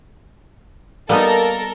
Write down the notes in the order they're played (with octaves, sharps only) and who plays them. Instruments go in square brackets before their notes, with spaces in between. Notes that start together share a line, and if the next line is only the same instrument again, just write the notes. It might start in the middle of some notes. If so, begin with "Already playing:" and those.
[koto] G3 B3 D#4 [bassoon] A#3 [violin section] A4 A#4 [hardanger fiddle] A5 A#5